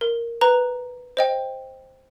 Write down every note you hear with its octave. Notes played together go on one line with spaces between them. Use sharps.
A#4
B4 A#5 F#6
C5 D#5 G5